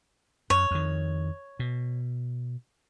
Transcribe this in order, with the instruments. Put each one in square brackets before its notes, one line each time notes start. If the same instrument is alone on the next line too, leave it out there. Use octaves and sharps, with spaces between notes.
[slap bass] F#2 [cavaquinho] C#5
[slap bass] F2 D#3
B2